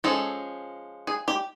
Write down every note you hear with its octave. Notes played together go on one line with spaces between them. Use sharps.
F3 G#3 C#4 A4
G#4
G4